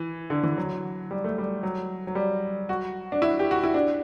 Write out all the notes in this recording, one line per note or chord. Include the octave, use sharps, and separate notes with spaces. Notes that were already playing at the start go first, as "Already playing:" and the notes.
Already playing: E3
D3
E3
F#3
G3
A3
G3
F#3
F#3
G3
F#4
D4
E4
G4
F#4
E4
D4